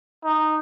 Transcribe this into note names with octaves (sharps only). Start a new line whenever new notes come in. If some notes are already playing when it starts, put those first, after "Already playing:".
D#4